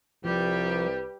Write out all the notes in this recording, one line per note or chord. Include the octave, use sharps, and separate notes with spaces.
C2 F3 G3 G4 B4